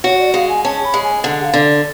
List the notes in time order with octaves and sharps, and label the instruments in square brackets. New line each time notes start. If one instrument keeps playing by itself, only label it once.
[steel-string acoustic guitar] F#4 [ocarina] C#5
[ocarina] D5
[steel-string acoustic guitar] G#3 [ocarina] F5
[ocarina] G#5
[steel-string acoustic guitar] C#4 [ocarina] A5
[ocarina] B5
[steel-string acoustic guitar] G#3
[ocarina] G#5
[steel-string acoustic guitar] D3 [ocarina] F#5
[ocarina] F5
[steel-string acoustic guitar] D3
[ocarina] D5